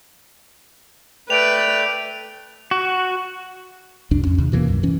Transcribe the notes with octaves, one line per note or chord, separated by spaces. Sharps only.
A3 B4 D5 G5 D7 F7
F#4
C2 F#2 D4
F2 C#4
D#2 C3
B2 E3 F3 A#3
C2 F#2
E3 C#4